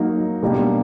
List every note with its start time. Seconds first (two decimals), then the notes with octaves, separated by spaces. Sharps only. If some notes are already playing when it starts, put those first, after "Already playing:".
Already playing: F#3 A#3 D#4 F#4
0.42 B2 G3 A#3 D4 G4